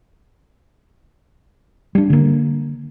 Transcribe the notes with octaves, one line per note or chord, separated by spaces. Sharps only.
G3 D4
D3 A#3